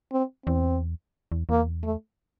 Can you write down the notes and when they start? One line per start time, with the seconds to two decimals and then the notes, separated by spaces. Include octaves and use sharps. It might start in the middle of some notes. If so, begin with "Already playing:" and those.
0.12 C4
0.46 E2 C4
1.32 E2
1.49 E2 A#3
1.83 A3